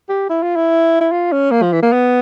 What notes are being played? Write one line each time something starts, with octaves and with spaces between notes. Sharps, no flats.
G4
E4
F4
E4
E4
F4
C#4
A#3
F3
E3
A#3
B3